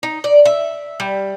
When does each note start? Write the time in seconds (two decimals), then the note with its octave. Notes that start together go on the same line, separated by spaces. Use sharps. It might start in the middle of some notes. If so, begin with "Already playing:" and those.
0.03 D#4
0.24 D5
0.46 E5
1.00 G3